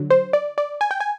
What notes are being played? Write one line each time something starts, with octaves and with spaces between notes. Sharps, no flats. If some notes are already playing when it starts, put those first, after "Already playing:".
Already playing: D3 F#3
C5
D5
D5
G#5
G5
G#5